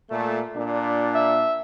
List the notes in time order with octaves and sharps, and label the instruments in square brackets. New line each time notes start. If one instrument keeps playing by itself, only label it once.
[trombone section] A#2 A3
A#2 D4
[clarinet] E5